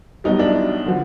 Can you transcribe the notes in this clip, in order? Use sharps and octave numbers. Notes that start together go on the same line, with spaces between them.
B1 B2 G3 D#4
D4 E4
D3 F3